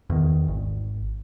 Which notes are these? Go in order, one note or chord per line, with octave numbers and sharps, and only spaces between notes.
E2 D#3
G#1